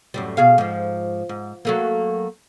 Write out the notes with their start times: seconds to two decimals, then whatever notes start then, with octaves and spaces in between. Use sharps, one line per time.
0.14 F#2 A2 G3
0.37 B2 G#4 F5
0.58 G#2 F3
1.29 G#2
1.65 F#3 A3 A#3